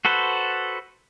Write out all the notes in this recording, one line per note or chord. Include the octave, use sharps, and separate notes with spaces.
F#4 A4 B4 C5